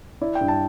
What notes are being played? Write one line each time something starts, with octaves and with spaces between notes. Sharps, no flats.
E4 D5
G5
G2
A5